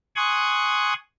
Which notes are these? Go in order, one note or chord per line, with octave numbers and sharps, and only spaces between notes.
G#5 C6 C#6 D#6 F#6 G#6